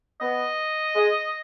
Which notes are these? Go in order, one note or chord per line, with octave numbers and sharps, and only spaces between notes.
B3 D#5
G#3